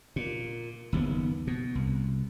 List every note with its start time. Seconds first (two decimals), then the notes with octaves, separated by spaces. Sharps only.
0.16 A#2
0.93 F#1 D#2 C3 B3
1.47 B2
1.75 C2